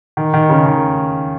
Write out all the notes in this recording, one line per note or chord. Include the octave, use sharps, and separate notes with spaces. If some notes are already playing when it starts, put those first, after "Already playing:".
D#3
D#3
C#3
D#3